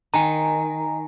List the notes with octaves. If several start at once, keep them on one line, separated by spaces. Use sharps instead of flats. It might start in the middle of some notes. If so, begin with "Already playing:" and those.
D#3 G#5 A#5